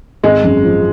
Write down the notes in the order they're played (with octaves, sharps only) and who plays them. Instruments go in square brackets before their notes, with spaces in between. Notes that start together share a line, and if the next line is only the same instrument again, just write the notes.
[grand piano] G#1 [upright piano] G#3
[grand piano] F#2
F3